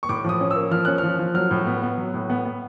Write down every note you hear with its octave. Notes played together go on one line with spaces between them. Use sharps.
C#6
A2 D6
F3 D#6
C#4
A#3 E6
F3 F6
C#4 F#6
F6
F3
F3
F#3 F6
A2
B3
B3
F#3
A2
B3
B3